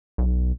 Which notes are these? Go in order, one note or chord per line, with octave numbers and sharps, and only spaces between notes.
B1